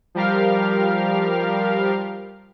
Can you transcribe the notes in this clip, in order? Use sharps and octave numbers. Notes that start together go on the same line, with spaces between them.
F3 G3 G4 A#4 F5 F6